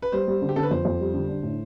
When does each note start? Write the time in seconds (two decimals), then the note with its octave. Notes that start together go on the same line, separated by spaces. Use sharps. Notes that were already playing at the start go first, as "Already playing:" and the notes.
0.02 B4
0.12 G3 C5
0.27 G3
0.42 D3
0.49 G4
0.56 D3 A4
0.63 B4
0.71 F2 C5
0.85 F2
1.00 G3
1.14 D3
1.29 D4
1.43 A2